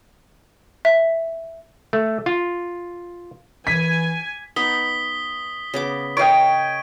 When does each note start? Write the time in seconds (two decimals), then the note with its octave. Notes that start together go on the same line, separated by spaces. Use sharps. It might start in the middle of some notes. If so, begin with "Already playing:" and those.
0.85 E5
1.93 A3
2.26 F4
3.67 E3 G#5 B6
4.56 B3 D#4 D#6 B6 G7
5.74 C#3 B3 D6
6.17 A#4 C#5 D#5 F5 G5 D7